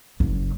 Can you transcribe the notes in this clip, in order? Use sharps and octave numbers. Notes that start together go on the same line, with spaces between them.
F#1